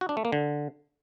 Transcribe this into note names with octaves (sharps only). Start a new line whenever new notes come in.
F#4
D4
A3
A#3
D3